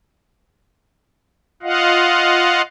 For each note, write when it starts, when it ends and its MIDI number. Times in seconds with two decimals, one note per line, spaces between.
1.63 2.62 65
1.63 2.62 75
1.63 2.62 77
1.63 2.62 78